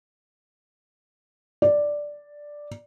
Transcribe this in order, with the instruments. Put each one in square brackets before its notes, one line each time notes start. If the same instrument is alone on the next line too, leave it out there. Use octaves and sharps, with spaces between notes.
[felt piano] D5